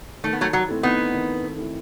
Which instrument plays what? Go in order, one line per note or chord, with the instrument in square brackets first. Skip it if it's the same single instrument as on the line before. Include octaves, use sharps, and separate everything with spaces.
[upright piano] D#3 [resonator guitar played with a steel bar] A3
[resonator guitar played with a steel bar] B3
F#3 A3
F#3
[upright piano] A3 C4 E4 A4
[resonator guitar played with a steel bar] B3 D#4
[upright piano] D#3
A3 C4 E4 A4